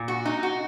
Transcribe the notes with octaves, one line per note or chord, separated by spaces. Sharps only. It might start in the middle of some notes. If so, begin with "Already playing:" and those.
Already playing: A#2
F#4
D#4
F#4